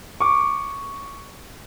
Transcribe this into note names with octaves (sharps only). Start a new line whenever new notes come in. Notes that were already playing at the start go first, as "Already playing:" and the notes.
C#6 D6